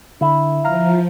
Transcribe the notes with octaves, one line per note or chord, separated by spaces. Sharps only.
D3 E4
F3 F5 A#5 F6